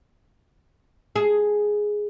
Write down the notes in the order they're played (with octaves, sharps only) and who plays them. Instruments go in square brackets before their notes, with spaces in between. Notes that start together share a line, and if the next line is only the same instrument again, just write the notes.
[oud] G#4